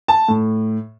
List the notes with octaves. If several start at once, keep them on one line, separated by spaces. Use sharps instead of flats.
A5
A2